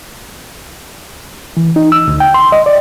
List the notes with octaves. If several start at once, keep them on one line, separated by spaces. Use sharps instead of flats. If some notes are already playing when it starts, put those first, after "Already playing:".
E3
D#4
E6
D2
G5
C6
D#5
D5